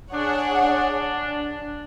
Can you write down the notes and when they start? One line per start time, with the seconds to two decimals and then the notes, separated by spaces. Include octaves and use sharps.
0.12 D4 G#4 C#5 F#5
0.62 D4